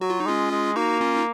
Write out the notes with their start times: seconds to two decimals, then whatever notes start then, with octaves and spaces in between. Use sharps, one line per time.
0.01 F#3 F#4
0.10 F4
0.20 D#4
0.26 G#3 C#4 F4
0.51 G#3
0.76 A#3 D#4 F#4
1.01 C#4 F4
1.16 D#4